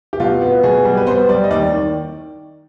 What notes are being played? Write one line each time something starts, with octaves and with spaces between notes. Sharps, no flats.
G4
B2 F4
B3
B2 G#4
G3
B4
B3 C5
G3 D5
D#5
D#2 D5
D#3